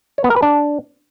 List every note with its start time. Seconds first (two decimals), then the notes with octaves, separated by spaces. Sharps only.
0.18 C#5
0.24 B3
0.30 A#4
0.36 B4
0.42 D4